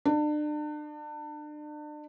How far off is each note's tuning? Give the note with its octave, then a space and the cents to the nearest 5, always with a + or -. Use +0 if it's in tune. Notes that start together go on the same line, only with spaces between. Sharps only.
D4 +35